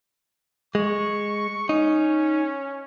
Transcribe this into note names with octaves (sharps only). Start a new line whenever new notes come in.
G#3 C#6
C#4 D#4